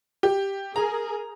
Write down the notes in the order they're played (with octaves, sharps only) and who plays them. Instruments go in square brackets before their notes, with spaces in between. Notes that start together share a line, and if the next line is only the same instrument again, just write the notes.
[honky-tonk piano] G4
[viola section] G#4 A#4 [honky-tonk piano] A#5